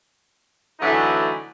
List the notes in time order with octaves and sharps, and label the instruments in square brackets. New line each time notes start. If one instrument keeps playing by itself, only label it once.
[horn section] D3 E3 F#3 A3 D#4 E4